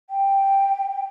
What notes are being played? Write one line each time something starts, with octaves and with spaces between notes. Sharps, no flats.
G5